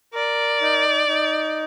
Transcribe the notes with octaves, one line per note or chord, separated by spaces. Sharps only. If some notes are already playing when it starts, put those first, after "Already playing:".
A#4 D5
D#4
D#4